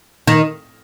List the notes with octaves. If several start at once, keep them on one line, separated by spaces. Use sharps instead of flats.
D#3